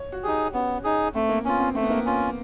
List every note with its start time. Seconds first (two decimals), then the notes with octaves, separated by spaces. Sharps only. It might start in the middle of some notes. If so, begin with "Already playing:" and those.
Already playing: C#5
0.12 F#4
0.23 D#4 G4 G#4
0.54 B3 C#4
0.84 D#4 G#4
1.15 A3 C4
1.29 A#3
1.45 B3 C#4 F4
1.59 C4
1.75 A3 C4
1.83 B3
1.90 A#3
1.98 B3
2.06 C#4 F4